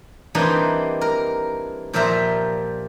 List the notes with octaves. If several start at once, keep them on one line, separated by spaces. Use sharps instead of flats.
E3 G3 A#3 C4 D4 D#4
A#4
A#2 F3 G3 A#4 E5 A#5